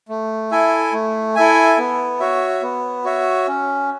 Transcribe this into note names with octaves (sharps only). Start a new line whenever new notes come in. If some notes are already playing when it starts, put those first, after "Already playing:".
A3
E4 A4 E5 G#5
A3
E4 A4 E5 G#5
B3
F#4 C#5 E5
B3
F#4 C#5 E5
C#4